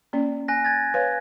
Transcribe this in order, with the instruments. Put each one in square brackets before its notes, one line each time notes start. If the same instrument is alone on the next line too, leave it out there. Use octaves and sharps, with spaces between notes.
[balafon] A#3 C#4 D5
[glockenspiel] G#5 F#6 A#6
G#6 A6
[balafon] B4 C#5 F5